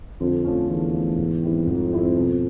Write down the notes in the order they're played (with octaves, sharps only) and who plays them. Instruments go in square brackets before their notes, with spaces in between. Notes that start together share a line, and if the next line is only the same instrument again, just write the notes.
[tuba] F2 [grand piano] D3
[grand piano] F3 A3 C#4
[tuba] E2 [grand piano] D3
[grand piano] F3 A3 C#4
G#2
D#3 G3 C4 E4
[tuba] F2 [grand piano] G#2
[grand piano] D#3 G3 C4 E4
B2